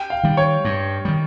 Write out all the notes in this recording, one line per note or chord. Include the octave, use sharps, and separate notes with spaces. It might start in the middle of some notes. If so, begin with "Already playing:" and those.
Already playing: G5
F5
D#3 G3
C#5
G2
D#3 G3